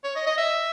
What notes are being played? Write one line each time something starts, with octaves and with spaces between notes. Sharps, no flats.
C#5
D#5
D#5
E5